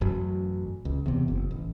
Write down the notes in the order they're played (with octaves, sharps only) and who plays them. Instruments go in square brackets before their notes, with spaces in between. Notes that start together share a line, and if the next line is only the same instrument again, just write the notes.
[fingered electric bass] A1 F#2 F#3
C#2
E2 C3
F#1
A1